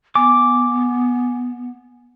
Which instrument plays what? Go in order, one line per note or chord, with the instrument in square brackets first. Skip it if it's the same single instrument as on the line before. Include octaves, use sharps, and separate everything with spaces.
[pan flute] B3 [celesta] G#5 [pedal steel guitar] D6